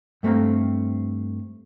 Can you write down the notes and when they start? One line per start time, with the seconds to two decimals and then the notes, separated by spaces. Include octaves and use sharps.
0.23 G2 A3 C4 F5 A#5